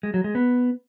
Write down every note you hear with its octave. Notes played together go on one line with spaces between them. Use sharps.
G#3
F#3
G#3
B3